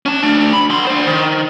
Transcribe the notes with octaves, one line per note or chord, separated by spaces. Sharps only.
C#4 A5
A3 D4
B5
B3 C6
D4 C5
D#3